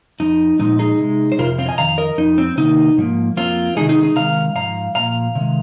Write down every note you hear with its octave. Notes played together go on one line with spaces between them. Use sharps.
F2 F3 D#4
A#2 F3 G#3 D#4
D#4 G#4
C3 G#3
C5
F2 C3 F3 F4 A#4
C4 F4
D#5 G#5
F2 D#3 F5 A#5
A#4 D#5
F2 F3 D#4
C4
C3 D#3 A#3 D#4
G#2 F3 A#3
F2 F3 A#3 C4 F4
C3 D#3 G#3 D#4 G#4
D#4 G#4
D#4 G#4
C3 D#3 G#3 F5 A#5
G#2 F3 F5 A#5
A#2 F3 A#3 F5 A#5
C3 D#3 G#3